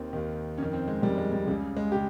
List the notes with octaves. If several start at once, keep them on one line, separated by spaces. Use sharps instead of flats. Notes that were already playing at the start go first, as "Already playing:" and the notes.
Already playing: D#2 D#3 C4
D#2 D#3
F2 D#3 C#4
C4
G#3
F2 D#3 G3
G#3
G3
C#2 C#3 G3
G#3
C#3 G4